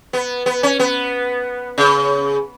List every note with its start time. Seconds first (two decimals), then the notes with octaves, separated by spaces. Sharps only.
0.13 B3
0.46 B3
0.63 C#4
0.79 B3
1.78 C#3